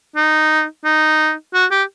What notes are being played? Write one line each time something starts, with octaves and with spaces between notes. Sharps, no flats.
D#4
D#4
F#4
G4